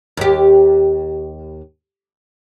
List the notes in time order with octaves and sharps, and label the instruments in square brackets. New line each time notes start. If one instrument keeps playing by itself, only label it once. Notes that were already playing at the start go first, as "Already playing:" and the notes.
[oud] D#2 G4